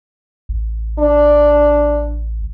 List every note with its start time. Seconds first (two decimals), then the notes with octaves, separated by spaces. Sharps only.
0.49 A1
0.99 D4